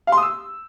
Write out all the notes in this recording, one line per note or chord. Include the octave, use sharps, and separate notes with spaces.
F5
C6
D#6
E6